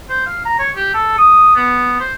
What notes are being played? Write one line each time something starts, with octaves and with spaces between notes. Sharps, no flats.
C5
F5
A#5
C#5
G4
A4
D#6
B3
C5